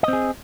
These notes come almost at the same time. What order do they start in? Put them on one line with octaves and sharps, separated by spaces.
D#5 C4 G#4